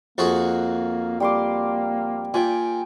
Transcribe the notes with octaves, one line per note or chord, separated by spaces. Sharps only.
F2 A#3 F#4 G#4
G3 A#3 C6 D6
A#2 G5 G#5